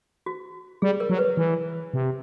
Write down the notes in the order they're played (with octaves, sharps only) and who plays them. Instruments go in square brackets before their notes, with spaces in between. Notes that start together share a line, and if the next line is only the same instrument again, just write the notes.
[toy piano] F#4
[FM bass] G3 [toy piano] G#4
[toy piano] A#4
[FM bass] F#3
[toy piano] B4
[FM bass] E3
C3